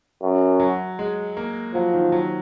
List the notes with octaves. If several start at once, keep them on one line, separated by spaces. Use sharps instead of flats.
F#2
F#3
G#3
A#3
F3 F#3
D#3
F#3